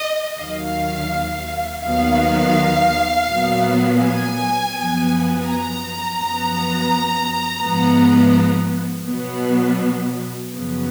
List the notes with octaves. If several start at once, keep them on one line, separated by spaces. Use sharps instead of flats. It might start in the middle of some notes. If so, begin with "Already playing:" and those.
Already playing: D#5
D#2 D#3 F#3 F5
D#2 D#3 F#3 B3 F5
A#2 F#3 B3
G#5
F#2 F3 B3
A#5
F#2 F3 B3
G#2 F3 B3
B2 F#3 B3
F#2 C#3 F3 B3